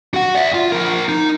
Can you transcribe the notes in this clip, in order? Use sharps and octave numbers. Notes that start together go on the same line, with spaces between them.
F#4 F#5
D5 E5
F4
F3 A#4
D#4